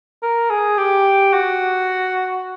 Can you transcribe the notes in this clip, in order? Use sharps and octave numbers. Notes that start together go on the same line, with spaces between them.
A#4
G#4
G4
F#4